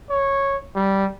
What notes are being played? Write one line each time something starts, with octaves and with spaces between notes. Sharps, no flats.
C#5
G3